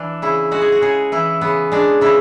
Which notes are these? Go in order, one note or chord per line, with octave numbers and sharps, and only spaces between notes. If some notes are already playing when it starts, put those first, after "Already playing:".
Already playing: E3 D4
C#3 E4
G#3 F#4
G#4
F#4
C#3 G#4
E3 E4
C#3 B3
G#3 D4
C#3 E4